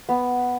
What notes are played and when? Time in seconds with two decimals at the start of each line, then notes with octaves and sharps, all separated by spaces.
0.09 B3